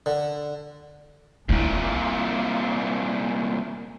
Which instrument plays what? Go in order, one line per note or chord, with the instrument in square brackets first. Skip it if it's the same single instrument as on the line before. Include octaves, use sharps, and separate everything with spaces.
[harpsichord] D3
[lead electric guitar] C2 A#2 [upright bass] D4 E4